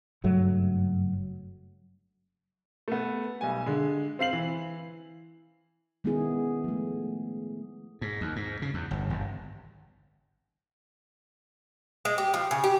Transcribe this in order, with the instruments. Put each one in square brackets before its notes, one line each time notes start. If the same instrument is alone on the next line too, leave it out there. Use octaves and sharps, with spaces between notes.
[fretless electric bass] F#1 G2 F#3 A3
[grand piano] A3 B3
B1 G3 G#5
D3 G#3
C4 F5 C7 F#7
E3
[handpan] D#3 G#3 B3 C#4 E4 G#4
F3 A3
[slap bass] G#2
D#2
G#2
C#3
E2
G1
G1
[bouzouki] G#3
G4
F3
C#3
G4